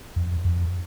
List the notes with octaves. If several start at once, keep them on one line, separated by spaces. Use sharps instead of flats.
F2
F2